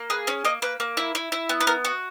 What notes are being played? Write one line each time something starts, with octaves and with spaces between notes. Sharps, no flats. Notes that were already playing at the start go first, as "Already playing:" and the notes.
Already playing: A#3
G#4 B4
C#4 C#5
A#3 D#5
A#3 B4
A#3
E4
E4
E4
B3
B4
B3 A#4
F#4